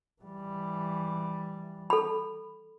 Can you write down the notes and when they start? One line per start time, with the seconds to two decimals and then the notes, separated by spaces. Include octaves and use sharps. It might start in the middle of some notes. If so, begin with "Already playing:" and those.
0.22 E3 G3
1.90 A4 B5